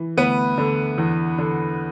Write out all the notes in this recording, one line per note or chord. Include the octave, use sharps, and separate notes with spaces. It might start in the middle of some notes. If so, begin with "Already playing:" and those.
Already playing: E3
D2 B3 B4
D3
E2
D3